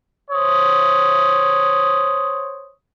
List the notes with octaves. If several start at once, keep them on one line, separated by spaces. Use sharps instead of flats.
C5 C#5 D#6